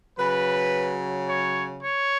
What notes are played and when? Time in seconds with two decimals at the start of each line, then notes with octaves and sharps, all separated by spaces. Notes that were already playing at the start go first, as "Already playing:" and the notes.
0.17 C#3 F#3 B4
1.27 C#5
1.82 C#5